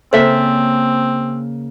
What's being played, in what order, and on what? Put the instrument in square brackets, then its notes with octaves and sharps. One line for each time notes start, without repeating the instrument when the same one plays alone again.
[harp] C#3 A#3 [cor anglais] C4 [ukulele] A4 E5 [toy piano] C5